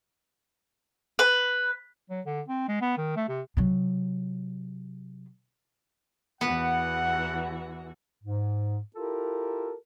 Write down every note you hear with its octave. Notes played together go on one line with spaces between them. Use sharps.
B4
F#3
D3
C4
G#3
B3
D#3
A3
C3
C3 F#3
E2 E3 B3 F#4 B4 F#5
G#2
E4 F4 G4 A4 A#4